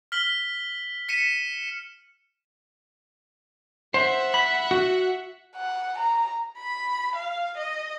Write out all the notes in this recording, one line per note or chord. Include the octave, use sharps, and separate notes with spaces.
F6 B6 F#7 G7
B6 C#7 D#7 E7
C5 E5 F#5
B5
F#4
F#5
A#5
B5
F5
D#5